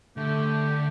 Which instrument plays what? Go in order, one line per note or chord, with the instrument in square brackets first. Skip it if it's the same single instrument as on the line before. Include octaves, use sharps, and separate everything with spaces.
[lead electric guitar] D3 [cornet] A3 [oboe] G4